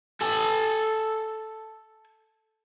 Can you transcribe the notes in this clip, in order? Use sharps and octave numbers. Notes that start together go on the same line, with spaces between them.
A4 G#5